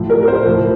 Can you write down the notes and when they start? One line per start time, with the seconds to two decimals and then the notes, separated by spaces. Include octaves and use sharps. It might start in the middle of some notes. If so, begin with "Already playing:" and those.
Already playing: A2 F3
0.10 A#4
0.23 A#4
0.28 C5
0.46 A2 F3